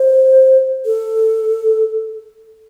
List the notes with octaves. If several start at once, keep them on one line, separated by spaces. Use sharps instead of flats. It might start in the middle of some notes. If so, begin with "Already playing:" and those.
Already playing: C5
A4